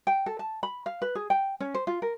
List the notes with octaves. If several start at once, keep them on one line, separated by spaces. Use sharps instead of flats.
G5
A4
A5
B5
F5
B4
G#4
G5
C#4
C5
F4
A#4